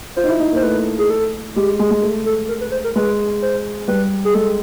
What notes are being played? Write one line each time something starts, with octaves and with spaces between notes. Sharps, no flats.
F4 C5
D#4
E4
D#4
A#3
C5
A3 B4
G#4
A4
G#3 G4
G#3
G#3
A3
A4
A#4
B4
C5
A#4
G#3 B4
C5
G3 B4
G#4
G#3 A4